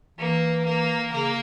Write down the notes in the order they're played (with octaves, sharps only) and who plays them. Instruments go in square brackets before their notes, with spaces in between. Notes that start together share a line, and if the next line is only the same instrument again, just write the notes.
[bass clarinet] E3 [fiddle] A#3
[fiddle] A#3
[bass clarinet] C#3 [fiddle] A#3